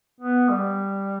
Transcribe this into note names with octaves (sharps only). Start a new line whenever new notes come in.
B3
G3